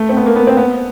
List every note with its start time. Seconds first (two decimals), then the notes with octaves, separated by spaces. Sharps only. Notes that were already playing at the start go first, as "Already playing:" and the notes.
Already playing: A3
0.09 C4
0.17 B3
0.26 A#3
0.36 B3
0.47 C4
0.57 B3